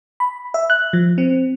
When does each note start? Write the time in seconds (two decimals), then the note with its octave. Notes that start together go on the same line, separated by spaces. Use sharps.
0.20 B5
0.54 E5
0.70 F#6
0.93 F3
1.18 C4